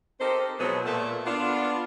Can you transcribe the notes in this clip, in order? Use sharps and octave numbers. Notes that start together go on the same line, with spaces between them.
C4 D#4 G4 A4 A#4 C5
B2 F3 F#3 G#3 B3
A#2 A3 A#3
B3 D4 F4